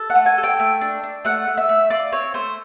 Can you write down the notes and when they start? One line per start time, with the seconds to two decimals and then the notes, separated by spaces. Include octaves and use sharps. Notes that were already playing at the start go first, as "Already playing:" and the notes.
Already playing: A4
0.10 F#5
0.15 A3
0.26 G#5
0.38 A4
0.44 G5
0.60 A3
0.81 D4
1.04 D4
1.25 A3 F#5
1.48 A3
1.57 E5
1.69 A3
1.90 F4 D5
2.12 C4 C#5
2.34 A3 C5